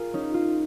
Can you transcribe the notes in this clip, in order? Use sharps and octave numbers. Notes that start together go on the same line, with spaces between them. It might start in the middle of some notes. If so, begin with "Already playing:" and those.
Already playing: F4 G#4 A#4
C#4 D#4
F4